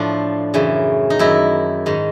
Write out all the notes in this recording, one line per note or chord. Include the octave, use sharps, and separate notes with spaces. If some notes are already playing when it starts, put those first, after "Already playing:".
Already playing: A2 F3 D4
F#2 C#3 E3
D#4
F#2 D#3 E4
G#2 D#3